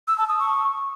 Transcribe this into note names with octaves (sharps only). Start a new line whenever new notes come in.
E6
A5
D#6
C#6